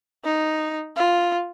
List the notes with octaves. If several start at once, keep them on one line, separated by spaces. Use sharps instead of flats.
D#4
F4